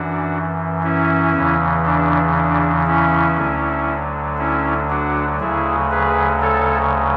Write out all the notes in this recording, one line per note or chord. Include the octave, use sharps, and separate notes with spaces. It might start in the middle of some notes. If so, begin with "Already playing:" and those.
Already playing: F#2 E3 D4 F#4
C#4 E4
E2 C#3 E3
D4
D4
C#4 E4
D2 D3 F#3
C#4 E4
D4 F#4
D2 C#3 F#3 E4 G#4
G#4 B4
A4 C#5